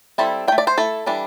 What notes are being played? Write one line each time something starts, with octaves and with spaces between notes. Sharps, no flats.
G3 C4 E4 A4
D4 G5
A3
D5
C5
A3 E4 A4
E3 G3 D4